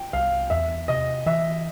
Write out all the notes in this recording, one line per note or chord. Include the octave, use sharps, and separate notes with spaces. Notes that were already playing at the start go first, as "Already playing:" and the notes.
Already playing: G5
C2 F5
E2 E5
C3 D#5
E3 E5